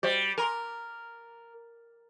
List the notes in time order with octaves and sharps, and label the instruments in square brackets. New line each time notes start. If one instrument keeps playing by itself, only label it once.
[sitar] G3 [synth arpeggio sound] F#4 C5 D#5
[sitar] A#4 [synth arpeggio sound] G#5 A#5 C6